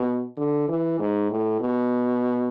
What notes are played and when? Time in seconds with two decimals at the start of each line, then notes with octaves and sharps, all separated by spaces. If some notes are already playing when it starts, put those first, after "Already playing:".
Already playing: B2
0.37 D3
0.68 E3
0.99 G#2
1.30 A2
1.61 B2